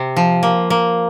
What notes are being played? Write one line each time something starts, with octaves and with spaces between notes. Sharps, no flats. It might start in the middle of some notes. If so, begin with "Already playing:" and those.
Already playing: C3
F3
A#3
A#3